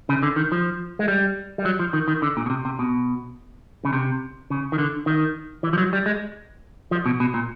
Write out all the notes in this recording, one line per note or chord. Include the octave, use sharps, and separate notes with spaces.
C#3
D3
D#3
F3
G#3
G3
G3
F#3
F3
D#3
D#3
D3
A#2
B2
C3
C3
B2
C#3
C3
C#3
D#3
D3
D#3
E3
F3
F#3
G3
G#3
F3
B2
B2
A#2